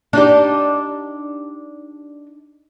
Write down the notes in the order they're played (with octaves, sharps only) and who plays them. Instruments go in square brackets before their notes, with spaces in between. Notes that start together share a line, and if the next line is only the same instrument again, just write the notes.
[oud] D4 D#4 G4